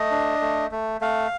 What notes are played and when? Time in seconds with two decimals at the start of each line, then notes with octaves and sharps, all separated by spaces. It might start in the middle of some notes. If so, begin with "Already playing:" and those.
Already playing: A3 D#5
0.11 D4
0.41 A3
0.71 A3
1.01 A3 F5